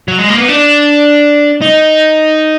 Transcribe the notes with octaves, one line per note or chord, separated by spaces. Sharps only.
F#3
G#3
A#3
B3
D4
D#4